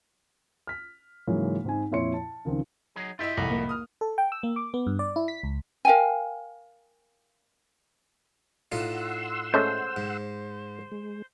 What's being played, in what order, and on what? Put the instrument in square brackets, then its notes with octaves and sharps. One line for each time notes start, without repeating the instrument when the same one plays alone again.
[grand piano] F6 B6
G#2 C#3 E3 F#3 G#3 A#3
G#2 C4 D#4 G#5
F2 A#2 E4 C#5 C6 C#7
A5
C#2 D#3 F3 C4
[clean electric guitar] F#3 D#4 G#4
[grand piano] E4 D#5 E5 [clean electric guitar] F4 G4
[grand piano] C2 F2 A2 [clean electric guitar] D#5 B5
[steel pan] A#3
[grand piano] D#6 F6
[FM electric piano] A4
G5
E6
A#3
D6
B3
G2
D5
E4
B6
C#2
[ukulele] A#4 F5 G5 G#5
[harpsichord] A2 D#4 F4 [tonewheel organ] F#5 C6 E6
[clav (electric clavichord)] G#3 A3 C#4 [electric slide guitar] C5
[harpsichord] G#2
[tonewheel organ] G#3